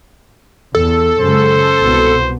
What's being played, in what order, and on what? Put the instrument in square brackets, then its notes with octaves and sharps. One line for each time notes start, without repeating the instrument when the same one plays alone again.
[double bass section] E2 [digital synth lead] A4
[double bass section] F#2 C#3 G#3 [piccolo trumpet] C5
[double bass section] C2 B2 B3